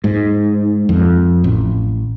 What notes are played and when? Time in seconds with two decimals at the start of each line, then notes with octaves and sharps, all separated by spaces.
0.04 G#2
0.89 F2
1.44 A1